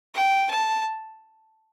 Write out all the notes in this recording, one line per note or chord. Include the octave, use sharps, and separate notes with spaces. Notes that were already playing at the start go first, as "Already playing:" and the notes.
G5
A5